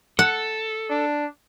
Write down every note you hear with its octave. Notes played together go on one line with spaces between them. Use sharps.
A4 F#5
D4